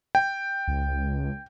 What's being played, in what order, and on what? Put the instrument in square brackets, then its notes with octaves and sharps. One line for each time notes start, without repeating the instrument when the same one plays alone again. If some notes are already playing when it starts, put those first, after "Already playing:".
[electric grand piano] G5
[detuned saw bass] C#2